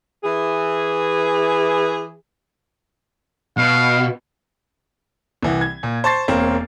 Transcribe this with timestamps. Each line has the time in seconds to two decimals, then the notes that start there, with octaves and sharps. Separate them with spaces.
0.24 E3 G#4
3.58 B2 F5
5.43 C2 E3 F#5
5.61 G#6
5.83 A#2
6.04 C5 A5 C#6 A6 C7
6.28 E1 A#3 C4 C#5